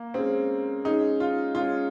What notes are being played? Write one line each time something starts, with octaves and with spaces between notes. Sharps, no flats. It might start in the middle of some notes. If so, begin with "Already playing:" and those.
Already playing: A#3
G#3 C4 C#4 G#4
G#3 C#4 D#4 G#4
F4
G#3 C#4 F4 G#4